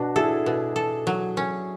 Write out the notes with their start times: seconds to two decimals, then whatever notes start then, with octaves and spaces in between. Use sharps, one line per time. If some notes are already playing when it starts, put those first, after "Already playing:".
Already playing: B2 D4 F#4
0.16 E4 G#4 A4
0.46 B2
0.76 A4
1.07 F#3
1.37 C#4